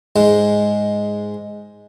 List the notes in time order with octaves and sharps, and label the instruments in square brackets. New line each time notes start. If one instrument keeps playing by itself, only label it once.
[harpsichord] G#2 G#3